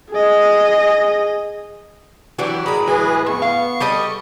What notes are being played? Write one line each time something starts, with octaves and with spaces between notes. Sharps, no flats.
G#4 D#5
E3 F#3 D4 F#4 G4
A2 G#3 A#4 B5
E3 F#3 G#4 B4 G#5
F2 B3 C#6
F5
G3 G4 A4 D#5